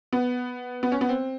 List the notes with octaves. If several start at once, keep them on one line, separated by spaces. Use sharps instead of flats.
B3
B3
C#4
B3
C4